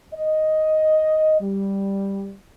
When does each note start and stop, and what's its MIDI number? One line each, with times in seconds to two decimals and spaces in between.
0.14 1.37 75
1.41 2.34 55